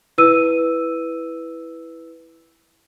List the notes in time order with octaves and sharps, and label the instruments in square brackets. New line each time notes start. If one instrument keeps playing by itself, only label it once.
[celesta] E4 B4 E6 D#7